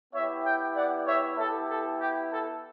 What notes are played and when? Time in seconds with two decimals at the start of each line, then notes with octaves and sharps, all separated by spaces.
0.13 B3 E4 G4 C#5 E5
0.44 E5 G5
0.75 D5 F#5
1.07 C#5 E5
1.37 B3 E4 G4 A4
1.69 A4
2.00 G4
2.31 A4